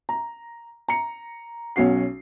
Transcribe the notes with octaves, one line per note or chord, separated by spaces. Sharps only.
A#5
A#5 C#7
B1 C#4 F#4 C7